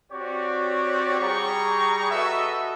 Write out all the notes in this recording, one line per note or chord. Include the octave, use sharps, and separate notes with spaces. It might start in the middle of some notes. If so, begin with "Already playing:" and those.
C4 F#4 G4 C#5 D5
G3 G#4 G5 A#5 C#6
F#4 A4 B4 D#5 E5